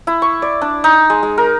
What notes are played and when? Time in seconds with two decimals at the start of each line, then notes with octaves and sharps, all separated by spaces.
0.07 E4
0.22 C#6
0.42 D5
0.62 D4
0.84 D#4
1.10 G#3
1.23 G#3
1.38 A#4